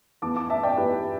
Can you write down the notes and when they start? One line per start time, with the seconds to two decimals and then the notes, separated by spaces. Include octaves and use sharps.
0.22 E2 E3 B3 A5 D6
0.36 A5 D6
0.50 E5 A5
0.63 D5 G5
0.77 E2 E3 B3 G4 B4